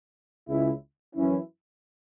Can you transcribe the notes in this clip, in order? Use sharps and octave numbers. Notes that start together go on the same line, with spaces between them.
C#2 C#3 G#3 E4
F#2 E3 C#4 E4